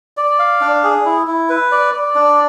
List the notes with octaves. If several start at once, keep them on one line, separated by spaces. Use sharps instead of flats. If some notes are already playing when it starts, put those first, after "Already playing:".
D5
F5
D4
G#4
E4
E4
B4
D5
D5
D4